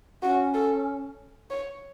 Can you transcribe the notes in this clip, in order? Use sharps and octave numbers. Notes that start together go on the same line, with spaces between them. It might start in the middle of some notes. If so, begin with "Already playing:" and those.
C#4 F#4
A4
C#5